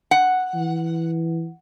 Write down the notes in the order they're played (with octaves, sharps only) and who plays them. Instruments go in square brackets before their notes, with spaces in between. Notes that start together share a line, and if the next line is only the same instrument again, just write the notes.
[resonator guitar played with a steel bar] F#5
[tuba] E3